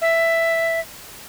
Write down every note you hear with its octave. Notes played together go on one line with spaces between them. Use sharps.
E5